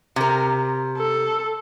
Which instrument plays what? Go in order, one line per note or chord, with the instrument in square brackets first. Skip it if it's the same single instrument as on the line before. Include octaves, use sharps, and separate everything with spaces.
[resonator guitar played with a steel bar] C3 A#4
[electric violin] A4